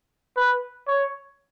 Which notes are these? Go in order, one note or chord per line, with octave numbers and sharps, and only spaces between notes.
B4
C#5